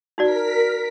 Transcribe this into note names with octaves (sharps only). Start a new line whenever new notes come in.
D#4 F#4 A#4 D5 B6